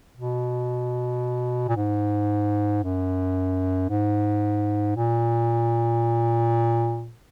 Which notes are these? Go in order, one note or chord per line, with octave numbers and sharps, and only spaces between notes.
B2
A#2
G#2
F#2
G#2
A#2